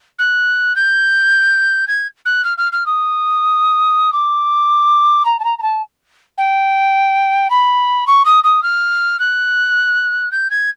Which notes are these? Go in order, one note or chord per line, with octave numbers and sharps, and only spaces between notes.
F#6
G6
G#6
F#6
F6
F6
F6
D#6
D6
A#5
A5
A#5
A#5
A5
G5
B5
C#6
D#6
D#6
F6
F#6
G6
G#6